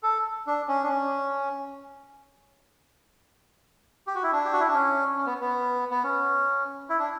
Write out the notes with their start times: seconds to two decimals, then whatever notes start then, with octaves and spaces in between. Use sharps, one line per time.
0.03 A4
0.47 D4
0.68 C#4
0.83 D4
0.89 C#4
4.07 G4
4.15 F#4
4.23 E4
4.32 D4
4.45 G4
4.53 F#4
4.60 E4
4.67 D4
4.74 C#4
5.18 C#4
5.26 B3
5.41 B3
5.91 B3
6.04 C#4
6.89 E4
6.99 D4